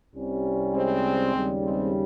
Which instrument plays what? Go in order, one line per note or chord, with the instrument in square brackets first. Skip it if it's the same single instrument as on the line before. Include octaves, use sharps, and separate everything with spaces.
[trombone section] C2 C3 G3 C#4
[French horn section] G#3 C4
[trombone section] D#2 C#3 G3
[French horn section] G#3 C4